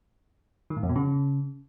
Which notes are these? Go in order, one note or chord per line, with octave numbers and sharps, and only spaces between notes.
D#3
A2
F2
B2
C#3